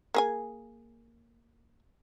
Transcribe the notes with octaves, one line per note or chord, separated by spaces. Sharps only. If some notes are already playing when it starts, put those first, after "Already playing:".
A#3 G#4 G#5